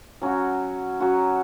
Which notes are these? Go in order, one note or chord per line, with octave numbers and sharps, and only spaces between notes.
F#3 C#4 F#4
F#3 C#4 F#4